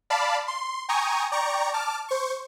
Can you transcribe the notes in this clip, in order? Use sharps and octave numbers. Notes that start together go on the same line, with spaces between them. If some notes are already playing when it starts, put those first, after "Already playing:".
D5 F5 A5 B5
C6
G5 G#5 A#5 C#6 D#6
D5 G5 A#5 C#6
A5 D6 F6
C5 C#6